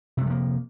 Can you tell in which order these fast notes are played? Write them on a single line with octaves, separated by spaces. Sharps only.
C3 G#3 F3 A#3